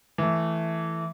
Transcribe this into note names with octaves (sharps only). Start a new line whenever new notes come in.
E3 A3